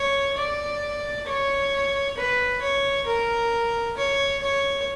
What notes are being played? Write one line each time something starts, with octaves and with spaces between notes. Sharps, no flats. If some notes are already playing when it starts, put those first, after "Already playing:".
Already playing: C#5
D5
C#5
B4
C#5
A#4
C#5
C#5